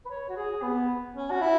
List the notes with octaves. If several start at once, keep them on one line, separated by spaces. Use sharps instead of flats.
B4
C#5
F#4
G#4
B3
C#4
F#4
E4